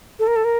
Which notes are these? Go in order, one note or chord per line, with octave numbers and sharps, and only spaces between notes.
A4
A#4
A4
A#4